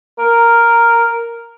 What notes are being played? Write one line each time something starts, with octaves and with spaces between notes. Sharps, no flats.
A#4